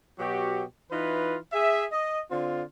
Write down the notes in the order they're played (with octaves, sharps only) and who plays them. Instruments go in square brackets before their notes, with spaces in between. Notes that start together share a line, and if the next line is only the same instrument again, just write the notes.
[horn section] B2 F#3 F#4 G4
E3 D#4 F4 B4
G#4 E5
D#5
D3 C4 F4